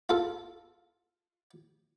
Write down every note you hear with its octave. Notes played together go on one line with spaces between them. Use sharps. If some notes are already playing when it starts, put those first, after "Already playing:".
F4 A4